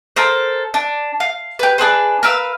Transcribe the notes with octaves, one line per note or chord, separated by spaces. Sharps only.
A4 A#4 C5
D4
F5
G4 B4
D4 G#4 B4 C5
A#4 B4 F5 E6